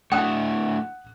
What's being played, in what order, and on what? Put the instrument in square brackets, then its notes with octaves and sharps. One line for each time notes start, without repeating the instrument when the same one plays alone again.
[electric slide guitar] A3 D4 E4 [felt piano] F#5 D#6 F#6 [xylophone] G5